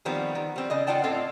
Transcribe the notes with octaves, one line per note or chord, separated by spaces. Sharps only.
D#3 F3 G3 B3 C4
D#3
G3 C4
C#3 D5 D#5
C#4 F4 D5 F#5 G5 A5
A2 C4 F4 A4 D5